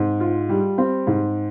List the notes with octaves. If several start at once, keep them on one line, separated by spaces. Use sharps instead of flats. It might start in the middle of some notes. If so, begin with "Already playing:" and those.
Already playing: G#2 C4
F4
G3
C4
G#2